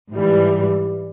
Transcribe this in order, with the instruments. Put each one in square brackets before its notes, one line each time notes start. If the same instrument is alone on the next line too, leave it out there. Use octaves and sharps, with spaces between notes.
[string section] G#2 E3 G3